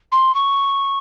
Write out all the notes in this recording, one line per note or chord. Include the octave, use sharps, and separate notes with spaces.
C6
C#6